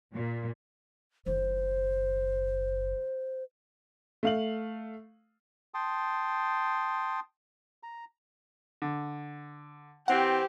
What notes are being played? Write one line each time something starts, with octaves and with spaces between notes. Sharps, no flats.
A#2
F#1 D#3 C5
A3 F5 F#7
G5 A5 C6 D#6
A#5
D3
E3 C4 G4 F#5